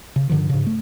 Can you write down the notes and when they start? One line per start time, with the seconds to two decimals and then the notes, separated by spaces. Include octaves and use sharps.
0.16 C#3
0.29 G2 D3 D#3 F3
0.49 G#2 C#3
0.67 A3